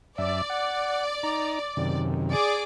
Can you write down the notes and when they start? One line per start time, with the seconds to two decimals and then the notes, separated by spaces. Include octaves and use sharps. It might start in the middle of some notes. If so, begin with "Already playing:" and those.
0.18 F#2 D5 E5
0.50 F#5
1.23 D#4 A#5
1.77 F#2 C3 D#3
2.31 G#4 D5 D6